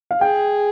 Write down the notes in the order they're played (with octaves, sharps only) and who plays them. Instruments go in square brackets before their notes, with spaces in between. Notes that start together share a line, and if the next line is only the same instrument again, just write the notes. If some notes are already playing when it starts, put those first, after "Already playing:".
[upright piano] F5
[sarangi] G#4 [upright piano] G5